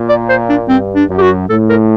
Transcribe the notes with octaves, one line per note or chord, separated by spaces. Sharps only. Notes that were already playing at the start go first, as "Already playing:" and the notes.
Already playing: A#2
D5
C5
D4
G2 C4
D4
F#2
G4
F#4
A2 A4
A#4